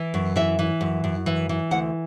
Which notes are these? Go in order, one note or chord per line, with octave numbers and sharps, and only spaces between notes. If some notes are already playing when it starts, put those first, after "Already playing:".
Already playing: E3
F#2
E3 E5
E3
F#2
F#2
E3
E3
D2 F#5